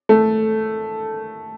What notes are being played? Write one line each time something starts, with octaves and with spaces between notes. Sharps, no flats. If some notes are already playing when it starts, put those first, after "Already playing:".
A3